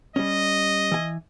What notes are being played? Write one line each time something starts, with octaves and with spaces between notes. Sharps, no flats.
G3 C#4 D#5
E3 G#5